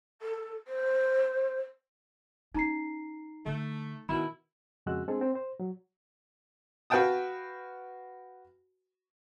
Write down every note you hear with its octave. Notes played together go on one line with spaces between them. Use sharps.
A4
C5
C#4 D#4 A#5 C7
D3 A3
B2 D#3 E4 B5
F2 C#3 G#3 F#4 E6 F#6
G#3 C4 D4 G#4 A4
C4
C5
F#3
F#4 B4 F5 G5 A5 D#6